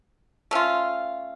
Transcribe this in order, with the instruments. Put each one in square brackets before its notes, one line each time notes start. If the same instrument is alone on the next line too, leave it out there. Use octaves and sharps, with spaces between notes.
[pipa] A3 C#4 F4